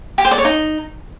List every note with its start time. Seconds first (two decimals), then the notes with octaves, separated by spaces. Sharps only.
0.18 G4
0.25 C5
0.31 D5
0.38 C#5
0.45 D#4